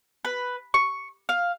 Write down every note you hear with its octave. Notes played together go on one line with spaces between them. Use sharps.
B4
C#6
F5